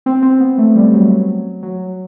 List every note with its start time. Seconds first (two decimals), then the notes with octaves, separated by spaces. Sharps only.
0.06 C4
0.23 C4
0.40 B3
0.58 A3
0.75 G3
0.93 F#3
1.63 F#3